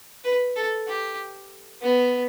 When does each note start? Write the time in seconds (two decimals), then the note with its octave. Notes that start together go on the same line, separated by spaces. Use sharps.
0.24 B4
0.56 A4
0.88 G4
1.82 B3